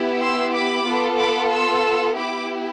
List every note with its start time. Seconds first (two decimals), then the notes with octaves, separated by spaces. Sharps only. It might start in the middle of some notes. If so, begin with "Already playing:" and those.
Already playing: B3 E4 G4
0.19 C6 E6
0.52 B5 D6
0.84 B3 F4 A4
1.18 B5 D6
1.50 C6 E6
2.16 B3 E4 G4 B5 D6